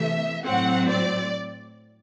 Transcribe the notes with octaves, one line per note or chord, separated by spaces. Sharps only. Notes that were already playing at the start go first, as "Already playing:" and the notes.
Already playing: C3 E3 A3 E5
A2 F#3 C4 F#5
D5